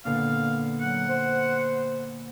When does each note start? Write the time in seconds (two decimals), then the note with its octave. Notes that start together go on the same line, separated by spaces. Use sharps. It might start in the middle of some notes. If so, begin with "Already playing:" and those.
0.05 A#2 D3 B3 F5
0.81 F#3 F#5
1.09 C5